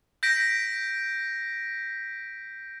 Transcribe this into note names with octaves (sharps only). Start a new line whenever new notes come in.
G6 A#6 B6 D7